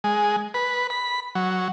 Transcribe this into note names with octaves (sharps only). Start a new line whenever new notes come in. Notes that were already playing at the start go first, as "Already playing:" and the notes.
G#3
B4
B5
F#3